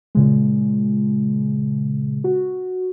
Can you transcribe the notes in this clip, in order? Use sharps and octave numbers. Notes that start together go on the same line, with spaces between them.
A#2 C#3 G#3
F#4